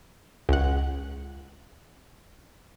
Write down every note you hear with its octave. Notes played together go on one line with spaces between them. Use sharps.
C#2 F#5